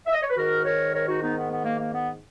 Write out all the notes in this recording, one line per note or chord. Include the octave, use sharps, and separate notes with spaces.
E5
D#5
C#5
B4
G#2 D#3 F#4 A#4
A#4 C#5
A#4 C#5
D#4 F#4
B3 D#4
B3
B3
A#3
A#3
B3